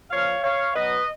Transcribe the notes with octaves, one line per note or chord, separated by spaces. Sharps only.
A#2 F3 C#5 F5
C#5 F5
B2 F#3 B4 D#5